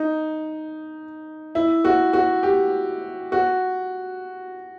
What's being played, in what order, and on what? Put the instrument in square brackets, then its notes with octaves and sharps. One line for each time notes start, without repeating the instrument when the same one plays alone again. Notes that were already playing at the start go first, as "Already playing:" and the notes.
Already playing: [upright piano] D#4
E4
F#4
F#4
G4
F#4